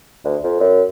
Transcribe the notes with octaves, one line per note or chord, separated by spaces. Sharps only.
D2
F2
F#2